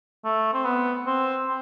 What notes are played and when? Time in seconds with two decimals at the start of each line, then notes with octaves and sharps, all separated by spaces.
0.24 A3
0.53 C4
0.65 B3
1.06 C4
1.47 C4